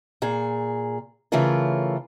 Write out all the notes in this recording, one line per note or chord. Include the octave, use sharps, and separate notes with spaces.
A#2 G#4
C#3 E3 A3 C#4 F4 A#4